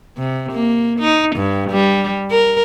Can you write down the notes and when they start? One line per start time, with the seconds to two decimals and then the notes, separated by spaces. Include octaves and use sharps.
0.18 C3
0.52 A#3
0.99 D#4
1.36 G2
1.70 G3
2.31 A#4